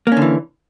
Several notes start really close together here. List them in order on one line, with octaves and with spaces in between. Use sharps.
A#3 C#4 D3 E3